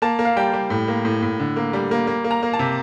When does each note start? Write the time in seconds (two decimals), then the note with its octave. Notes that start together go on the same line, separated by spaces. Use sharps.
0.02 A#3 A5
0.19 A#3
0.25 F5
0.36 G3 G5
0.53 G3
0.70 A2
0.88 A#3
1.05 A2
1.22 A2
1.40 D3
1.56 A#3
1.73 G3
1.91 A#3
2.07 A#3
2.24 A#3
2.31 A#5
2.43 A#3
2.53 A5
2.59 C3